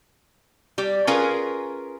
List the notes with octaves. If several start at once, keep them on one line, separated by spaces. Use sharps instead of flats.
G3 G4
C#4 F4 G#4 A#4 B4 F5